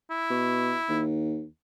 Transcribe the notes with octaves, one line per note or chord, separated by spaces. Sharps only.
E4
B2
D#2